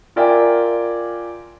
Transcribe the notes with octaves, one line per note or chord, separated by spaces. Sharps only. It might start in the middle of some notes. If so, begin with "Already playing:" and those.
F4 A#4 D5 E5 G5 G#5